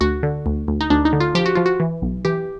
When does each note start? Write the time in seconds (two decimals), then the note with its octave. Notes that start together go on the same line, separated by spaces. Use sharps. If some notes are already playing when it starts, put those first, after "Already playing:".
0.01 D2 F#4
0.23 D3
0.46 D2
0.68 D2
0.81 D#4
0.90 D2 D4
1.05 D#4
1.13 D3
1.20 F4
1.35 F3 G4
1.46 F#4
1.55 F3 F4
1.66 F#4
1.80 E3
2.02 B1
2.25 E3 G4